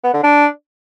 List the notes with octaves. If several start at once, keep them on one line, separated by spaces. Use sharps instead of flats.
B3
D3
D4